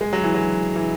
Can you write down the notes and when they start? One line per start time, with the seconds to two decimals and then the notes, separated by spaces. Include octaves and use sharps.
0.01 G#3
0.13 F#3
0.23 E3
0.34 F#3
0.76 E3